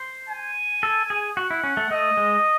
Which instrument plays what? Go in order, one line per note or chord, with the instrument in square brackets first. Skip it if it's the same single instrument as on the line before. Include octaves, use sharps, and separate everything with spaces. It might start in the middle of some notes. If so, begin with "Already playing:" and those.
Already playing: [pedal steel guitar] C5
[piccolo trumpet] G#5
[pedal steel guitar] A4
G#4
[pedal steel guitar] F#4 [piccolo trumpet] F#5
[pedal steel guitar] E4
C#4
A3
[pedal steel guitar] A3 [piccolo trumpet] D#5
[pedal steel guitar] G#3